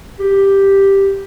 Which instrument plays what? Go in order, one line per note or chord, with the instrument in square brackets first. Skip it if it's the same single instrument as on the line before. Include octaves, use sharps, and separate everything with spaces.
[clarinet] G4